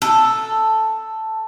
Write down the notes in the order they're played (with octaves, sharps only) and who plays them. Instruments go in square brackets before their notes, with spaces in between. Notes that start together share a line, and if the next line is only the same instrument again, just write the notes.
[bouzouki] A4